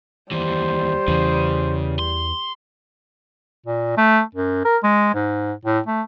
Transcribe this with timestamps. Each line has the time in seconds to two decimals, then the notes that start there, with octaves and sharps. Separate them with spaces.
0.32 D#2 E3 G3 C5
1.08 E2 C#3 E3
1.99 C6
3.66 A#2
3.97 A3
4.35 F#2
4.65 A#4
4.83 G#3
5.14 G#2
5.65 A2
5.87 A3